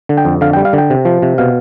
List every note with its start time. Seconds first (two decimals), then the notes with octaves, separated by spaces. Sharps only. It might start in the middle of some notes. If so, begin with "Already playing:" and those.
0.09 D3
0.17 G5
0.25 F2
0.41 D3 F5
0.53 G3 G5
0.65 F5
0.73 D3
0.78 G5
0.90 C3
1.05 F3
1.22 C3
1.38 B2 F5